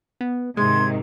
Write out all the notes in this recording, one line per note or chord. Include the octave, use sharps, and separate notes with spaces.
B3
G#2 C3 D#3 G#3 C6 G#6